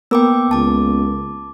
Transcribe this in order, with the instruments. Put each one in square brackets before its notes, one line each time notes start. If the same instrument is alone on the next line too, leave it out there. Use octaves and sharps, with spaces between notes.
[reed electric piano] A#3 B3 A#4 [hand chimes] G5 D6 E6
[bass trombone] C#2 [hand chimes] A5 D6